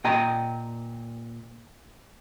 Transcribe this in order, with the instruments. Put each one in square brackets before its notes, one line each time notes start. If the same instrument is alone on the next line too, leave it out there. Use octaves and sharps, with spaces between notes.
[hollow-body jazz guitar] A#2 D#5 G5 A#5